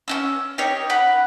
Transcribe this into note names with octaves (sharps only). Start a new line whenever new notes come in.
C#4 D#4 E6
D#4 G4 C#5
F#5 B5